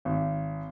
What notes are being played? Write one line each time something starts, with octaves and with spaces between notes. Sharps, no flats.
G#1